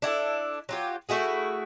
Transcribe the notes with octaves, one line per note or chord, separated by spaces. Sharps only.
D4 E4 F#4 A4
F#3 F4 G4
A3 E4 F#4 G#4